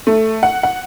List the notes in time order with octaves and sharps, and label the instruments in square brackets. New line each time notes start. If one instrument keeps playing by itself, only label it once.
[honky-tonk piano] A3
F#5
F#5